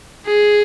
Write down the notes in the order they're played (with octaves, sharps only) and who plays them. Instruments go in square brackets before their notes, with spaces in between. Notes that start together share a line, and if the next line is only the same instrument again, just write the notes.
[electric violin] G#4